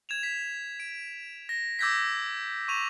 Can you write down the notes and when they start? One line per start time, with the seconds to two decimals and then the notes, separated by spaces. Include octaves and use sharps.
0.09 G#6 E7 F7
0.23 B6
0.80 D7
1.49 A#6
1.79 D6 E6 G6 G#6 A#6 B6
2.68 C#6 D#7 F7